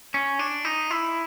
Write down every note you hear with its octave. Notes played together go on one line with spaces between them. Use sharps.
C#4
D4
D#4
E4